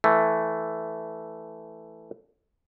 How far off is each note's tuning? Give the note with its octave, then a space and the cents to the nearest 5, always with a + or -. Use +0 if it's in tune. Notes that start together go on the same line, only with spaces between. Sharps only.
E3 +0 A3 +0